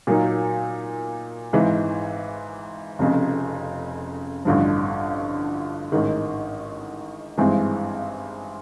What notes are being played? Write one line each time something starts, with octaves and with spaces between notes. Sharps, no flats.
A#2 F#3 A#3 D#4
G#1 G#2 E3
F1 F2 C#3
A1 G2 D3 F3
A1 G#2 D#3
G#1 G2 E3 G#3 C4